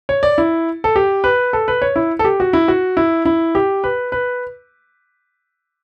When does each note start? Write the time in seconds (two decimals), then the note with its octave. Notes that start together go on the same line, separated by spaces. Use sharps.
0.09 C#5
0.23 D5
0.38 E4
0.84 A4
0.96 G4
1.24 B4
1.53 A4
1.68 B4
1.82 C#5
1.96 E4
2.19 A4
2.25 G4
2.40 F#4
2.53 E4
2.68 F#4
2.97 E4
3.25 E4
3.55 G4
3.84 B4
4.12 B4